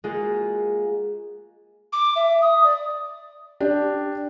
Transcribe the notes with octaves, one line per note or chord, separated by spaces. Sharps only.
G#3 A#3 F4 F#4
D6
E5
D#6
D5
D4 G4